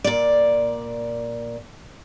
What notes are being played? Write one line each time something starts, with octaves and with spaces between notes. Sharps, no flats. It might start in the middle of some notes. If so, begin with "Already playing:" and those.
A#2 D5